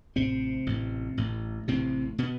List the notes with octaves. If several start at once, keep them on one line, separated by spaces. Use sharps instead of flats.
A1 A2 C3 C4
A1 A2
A1 A2
A1 A2 C3 C4
B2 B3